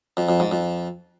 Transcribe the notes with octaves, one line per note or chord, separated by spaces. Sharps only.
F2
F2
G#2
F2